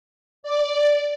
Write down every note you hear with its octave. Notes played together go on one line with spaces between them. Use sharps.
D5